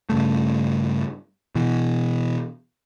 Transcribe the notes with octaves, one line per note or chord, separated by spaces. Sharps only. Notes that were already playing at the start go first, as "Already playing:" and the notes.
G2 C#3 A3
B2 E3